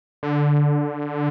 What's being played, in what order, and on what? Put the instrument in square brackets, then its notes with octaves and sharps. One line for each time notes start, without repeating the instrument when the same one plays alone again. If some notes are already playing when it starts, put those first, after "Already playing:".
[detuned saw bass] D3